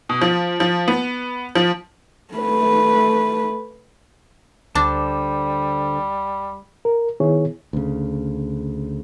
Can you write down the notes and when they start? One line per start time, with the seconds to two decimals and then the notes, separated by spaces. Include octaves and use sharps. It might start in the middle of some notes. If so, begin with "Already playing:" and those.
0.09 B2
0.22 F3
0.60 F3
0.88 B3
1.55 F3
2.34 A3 B4
4.75 D2 D3 G3 D4 C5 A5
6.85 A#4
7.20 D#3 B3 E4 G#4 C#5
7.73 D2 C#3